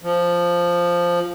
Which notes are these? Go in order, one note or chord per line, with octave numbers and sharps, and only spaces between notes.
F3